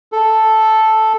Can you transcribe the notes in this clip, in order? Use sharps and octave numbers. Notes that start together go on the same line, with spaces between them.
A4